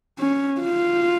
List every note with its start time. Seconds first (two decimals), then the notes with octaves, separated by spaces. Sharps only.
0.19 C#4
0.61 F4